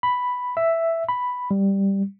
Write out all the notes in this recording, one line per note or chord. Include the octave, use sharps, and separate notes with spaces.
B5
E5
B5
G3